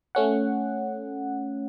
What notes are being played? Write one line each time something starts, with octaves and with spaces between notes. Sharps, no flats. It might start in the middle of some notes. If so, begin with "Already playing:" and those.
A3 C#4 F#5